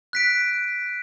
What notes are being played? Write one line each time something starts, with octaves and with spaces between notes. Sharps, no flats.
F#6 B6 D7